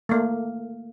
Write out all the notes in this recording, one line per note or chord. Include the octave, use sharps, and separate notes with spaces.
A3 A#3